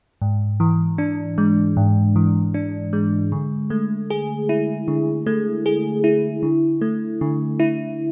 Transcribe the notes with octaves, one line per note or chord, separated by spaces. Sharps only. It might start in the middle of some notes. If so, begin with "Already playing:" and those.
G#2
E3
D4
G#3
G#2
E3
D4
G#3
D3
A3
G#4
E4
D3
A3
G#4
E4
D3
A3
D3
E4